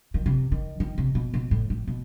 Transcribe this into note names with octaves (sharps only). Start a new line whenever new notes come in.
D#3
C3
D#3
D#3
C3
B2
B2
A2
A2
B2